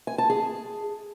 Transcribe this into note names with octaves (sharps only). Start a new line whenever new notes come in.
G#5
A5
G#4